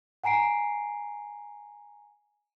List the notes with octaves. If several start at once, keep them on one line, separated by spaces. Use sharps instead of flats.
F#5 G#5 A#5 C7 D7